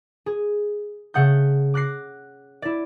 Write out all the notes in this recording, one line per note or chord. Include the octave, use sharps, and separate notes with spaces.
G#4
C#3 A3 F#5 D#6 G6
D6 F#6 A#6 C7
E4 D5